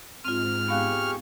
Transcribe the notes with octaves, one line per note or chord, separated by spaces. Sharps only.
G#2 C4 F4 F6
B3 G4 G#4 F5 C#6 F#6